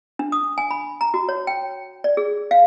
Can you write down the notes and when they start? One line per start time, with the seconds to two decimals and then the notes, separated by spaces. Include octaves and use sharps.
0.19 D4
0.32 D#6
0.58 G#5
0.71 B5
1.01 A#5
1.14 F#4
1.29 C#5
1.47 G5
2.04 D5
2.17 G#4
2.51 F5